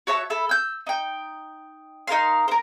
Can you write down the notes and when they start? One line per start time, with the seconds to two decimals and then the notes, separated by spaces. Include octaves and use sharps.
0.07 F#4 C#5 E5 A5
0.30 E4 A4 B5
0.49 E6 G6
0.87 D#4 G5
2.07 D#4 A#4 F5 C6
2.48 A#4 C5